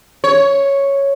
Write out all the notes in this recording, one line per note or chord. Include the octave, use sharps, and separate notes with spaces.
C#5